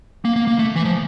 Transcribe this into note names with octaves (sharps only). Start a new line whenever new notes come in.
A#3
A#3
A#3
A3
E3
F3